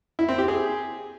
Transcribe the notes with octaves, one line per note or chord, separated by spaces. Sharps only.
E4
C4
G4
G#4